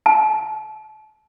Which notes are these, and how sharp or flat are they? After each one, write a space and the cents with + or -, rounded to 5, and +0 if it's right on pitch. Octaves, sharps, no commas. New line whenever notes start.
A5 -30